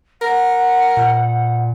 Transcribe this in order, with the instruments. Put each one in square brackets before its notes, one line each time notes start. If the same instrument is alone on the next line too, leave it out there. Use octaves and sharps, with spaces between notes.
[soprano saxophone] A#4 [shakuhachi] F#5
[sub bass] A#2